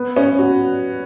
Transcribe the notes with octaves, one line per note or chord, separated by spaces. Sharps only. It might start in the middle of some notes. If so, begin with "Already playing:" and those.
Already playing: B3
C#4
F#4